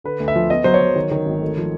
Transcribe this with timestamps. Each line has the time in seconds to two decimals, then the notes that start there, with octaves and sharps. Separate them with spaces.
0.04 D3 B4
0.20 D2
0.28 E5
0.35 F3
0.50 B3 D#5
0.64 F#3 C5
0.74 C#5
0.81 F#3
0.96 D#3
1.11 D#3
1.26 G#1
1.42 A3
1.57 F3